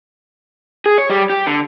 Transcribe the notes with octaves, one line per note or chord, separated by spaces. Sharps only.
G#4
C#5
G3
G4
D3